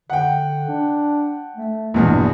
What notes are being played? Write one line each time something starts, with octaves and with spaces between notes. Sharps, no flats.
D3 F#5 G5
D4
A3
A#1 E2 G2 B2